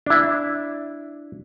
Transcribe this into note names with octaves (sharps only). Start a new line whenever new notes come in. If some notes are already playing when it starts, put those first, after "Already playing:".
D4 E4